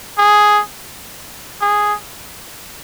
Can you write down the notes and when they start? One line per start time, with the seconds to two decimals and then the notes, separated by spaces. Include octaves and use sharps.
0.18 G#4
1.62 G#4